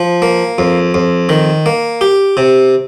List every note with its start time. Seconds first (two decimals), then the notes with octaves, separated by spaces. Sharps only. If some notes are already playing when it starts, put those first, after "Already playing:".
Already playing: F3
0.22 A#3
0.58 F2
0.94 F2
1.29 D#3
1.66 A#3
2.01 G4
2.37 C3